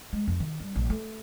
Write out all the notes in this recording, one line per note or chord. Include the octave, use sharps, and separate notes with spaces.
G#3
F2
D#3
G3
A#1
A3